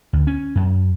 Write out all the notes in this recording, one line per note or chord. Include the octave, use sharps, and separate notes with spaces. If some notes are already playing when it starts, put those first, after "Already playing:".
D2
C#4
F#2